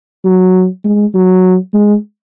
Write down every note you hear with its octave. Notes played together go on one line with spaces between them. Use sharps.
F#3
G#3
F#3
G#3